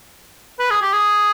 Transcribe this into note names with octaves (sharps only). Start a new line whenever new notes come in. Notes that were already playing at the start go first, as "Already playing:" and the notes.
B4
G#4
G4
G#4